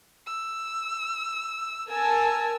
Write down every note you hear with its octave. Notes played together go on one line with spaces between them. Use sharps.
E6
A#4 G#5 A5 E6